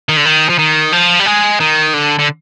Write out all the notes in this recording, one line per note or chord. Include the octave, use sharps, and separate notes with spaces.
D#3
D3
D#3
F3
D#3
F3
G3
G#3
D#3
D3
D3